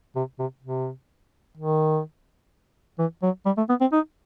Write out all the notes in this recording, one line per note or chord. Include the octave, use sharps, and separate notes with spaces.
C3
C3
C3
D#3
E3
F#3
G3
A3
B3
C4
D#4